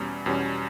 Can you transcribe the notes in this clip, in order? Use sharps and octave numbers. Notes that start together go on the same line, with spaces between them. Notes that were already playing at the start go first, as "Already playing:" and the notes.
Already playing: E2 B2 G3 C#4
E2 B2 G3 C#4